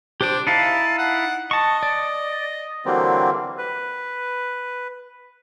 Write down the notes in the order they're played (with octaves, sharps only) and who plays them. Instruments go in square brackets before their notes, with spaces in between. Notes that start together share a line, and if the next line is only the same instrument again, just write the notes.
[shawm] D4 [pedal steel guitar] G4 C5 D6
[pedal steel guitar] D#4 E4 F5 [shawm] A5
[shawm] F#5
[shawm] D#5 [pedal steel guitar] A5 C#6
[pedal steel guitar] D5
[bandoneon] D3 E3 F#3 G3 A#3 C4
B4